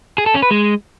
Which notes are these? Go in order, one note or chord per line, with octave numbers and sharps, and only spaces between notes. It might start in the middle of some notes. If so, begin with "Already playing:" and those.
G#4
A4
C#4
B4
G#3